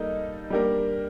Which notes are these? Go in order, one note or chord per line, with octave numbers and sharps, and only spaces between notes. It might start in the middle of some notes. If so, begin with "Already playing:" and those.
Already playing: G3 A#3 D#4 A4
G3 A#3 D4 G4 A#4